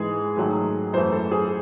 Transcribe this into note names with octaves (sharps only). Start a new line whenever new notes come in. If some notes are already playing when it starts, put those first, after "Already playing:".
Already playing: G#2 E3 G#3 G#4
G#2 D#3 F#3 A3
F#2 E3 A3 C5
A4
G#4